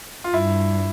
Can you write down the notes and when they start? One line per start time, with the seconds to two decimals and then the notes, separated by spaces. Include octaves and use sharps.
0.24 F4
0.33 G2 E4